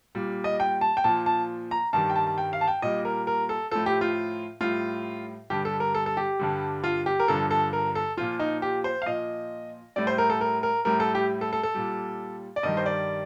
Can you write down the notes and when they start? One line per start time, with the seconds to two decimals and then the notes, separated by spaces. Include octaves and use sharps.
0.15 A#2 G3
0.44 D#5
0.60 G5
0.81 A5
0.97 G5
1.04 A#2 F3 A5
1.26 A5
1.71 A#5
1.93 G2 D#3 G3 A5
2.10 G5
2.16 A5
2.27 A5
2.38 G5
2.53 F5
2.61 A5
2.68 G5
2.82 A#2 G3 D#5
3.05 A#4
3.27 A#4
3.49 A4
3.71 A2 F3 A4
3.86 G4
4.01 F4
4.61 A2 G3 F4
5.50 G2 D3 G3 G4
5.65 A4
5.80 A#4
5.95 A4
6.06 A4
6.17 G4
6.39 G2 D3 G3
6.84 F4
7.06 G4
7.20 A#4
7.28 G2 D3 F3 A4
7.51 A4
7.73 A#4
7.95 A4
8.17 A#2 F3 F4
8.39 D#4
8.62 G4
8.84 C5
9.02 F5
9.06 A#2 F3 D#5
9.96 A2 G3 D5
10.07 C5
10.18 A#4
10.30 A4
10.41 A#4
10.63 A#4
10.85 A2 G3 A#4
11.00 A4
11.15 G4
11.41 A4
11.53 A4
11.63 A4
11.75 A#2 G3
12.56 D5
12.63 G2 D#3 G3 D#5
12.77 C5
12.86 D5